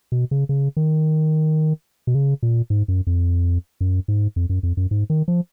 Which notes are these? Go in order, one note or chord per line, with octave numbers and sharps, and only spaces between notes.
B2
C#3
C#3
D#3
B2
C#3
A#2
G#2
F#2
F2
F#2
G#2
F2
F#2
F2
F#2
G#2
D#3
F3